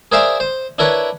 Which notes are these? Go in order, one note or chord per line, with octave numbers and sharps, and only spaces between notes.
G#4 A#4 C5 D5 E5 F5
C5
D4 E4 A#4 B4 C#5